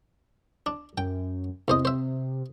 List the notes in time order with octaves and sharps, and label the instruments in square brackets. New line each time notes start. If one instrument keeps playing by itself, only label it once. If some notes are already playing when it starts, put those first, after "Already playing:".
[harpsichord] D4
[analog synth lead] F#2 [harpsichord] G5
[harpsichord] E2 C5 D#5 [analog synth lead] C3
[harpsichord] C5 E5